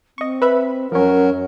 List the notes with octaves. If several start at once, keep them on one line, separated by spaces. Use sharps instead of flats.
C4 D#5 C#6
B4 E5 B5
F#2 F3 F#3 C#4 A#4 F#5